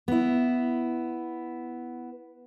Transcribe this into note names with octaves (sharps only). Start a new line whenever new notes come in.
B3 E4